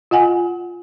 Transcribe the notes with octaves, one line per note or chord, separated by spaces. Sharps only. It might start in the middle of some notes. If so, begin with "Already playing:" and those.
F4 D#5 F#5 G#5